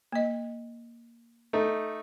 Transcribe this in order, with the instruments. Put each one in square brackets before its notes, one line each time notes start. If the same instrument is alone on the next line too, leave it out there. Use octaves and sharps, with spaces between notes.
[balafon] A#3 D#5
[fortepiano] A3 D#4